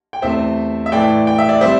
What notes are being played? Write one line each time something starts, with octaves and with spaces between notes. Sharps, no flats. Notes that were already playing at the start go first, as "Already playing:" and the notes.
G5
E2 C3 A3 C5 E5
E5
A2 E3 A3 D5 G5
G5
E5
D5
C3 G3 C5 E5